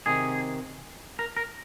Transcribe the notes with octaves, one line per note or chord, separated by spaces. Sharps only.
C3 D#3 G#4
A#4
A#4